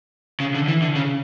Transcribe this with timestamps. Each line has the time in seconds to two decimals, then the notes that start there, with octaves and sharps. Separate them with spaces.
0.40 C#3
0.55 D3
0.68 E3
0.82 D3
0.95 C#3